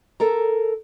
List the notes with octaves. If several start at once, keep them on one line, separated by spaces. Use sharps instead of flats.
A4 A#4 A#5